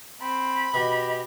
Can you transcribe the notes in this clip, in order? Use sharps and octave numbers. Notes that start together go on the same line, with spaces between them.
C4 B5
B2 G4 D#5